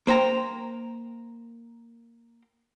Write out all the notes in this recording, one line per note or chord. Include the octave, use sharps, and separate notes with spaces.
A#3 C5 G5 A#5